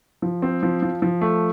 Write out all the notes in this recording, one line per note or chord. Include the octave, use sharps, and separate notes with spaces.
F3
C4
F3
F3
F3
A3